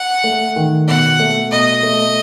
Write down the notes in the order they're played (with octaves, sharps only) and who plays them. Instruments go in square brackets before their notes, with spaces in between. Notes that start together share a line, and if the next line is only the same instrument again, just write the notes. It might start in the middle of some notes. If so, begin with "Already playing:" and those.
Already playing: [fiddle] F#5
[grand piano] A3
D#3
[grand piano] B2 [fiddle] F#5
[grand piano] A3
[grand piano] B2 [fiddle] D#5
[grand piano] A3